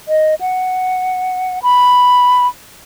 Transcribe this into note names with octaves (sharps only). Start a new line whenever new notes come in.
D#5
F#5
B5